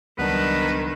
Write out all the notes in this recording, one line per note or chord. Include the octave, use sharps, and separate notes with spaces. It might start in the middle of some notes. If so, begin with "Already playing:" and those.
C#2 D#3 F#3 G3 B3 D4 B4